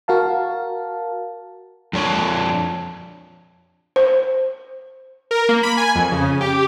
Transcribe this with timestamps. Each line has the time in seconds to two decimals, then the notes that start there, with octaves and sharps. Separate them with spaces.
0.08 F#4 A#4 F5 A5
1.93 F2 D4 C#5
3.96 C5
5.31 A#4
5.49 A#3
5.63 B5
5.77 G#5
5.95 F2
6.12 C#3
6.41 G4